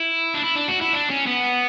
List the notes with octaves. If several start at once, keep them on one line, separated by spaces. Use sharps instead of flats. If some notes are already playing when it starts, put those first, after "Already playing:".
Already playing: E4
D4
E4
D4
F#4
E4
D4
C#4
B3